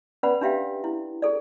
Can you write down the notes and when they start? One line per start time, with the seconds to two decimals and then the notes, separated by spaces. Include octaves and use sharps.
0.23 C#4 B4 D5 F#5 B5
0.41 D4 D#4 G4 E5 F5 G5
0.84 E4
1.22 G#4 A4 D5